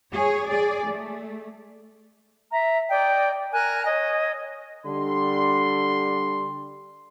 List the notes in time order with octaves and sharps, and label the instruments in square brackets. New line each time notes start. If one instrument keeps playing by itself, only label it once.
[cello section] G#4 C#5
G#4 D5
A3
[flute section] E5 A#5
D5 D#5 G5
A#4 G#5 A#5 F#6
C#5 D#5
[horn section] D3 G3 D4 C6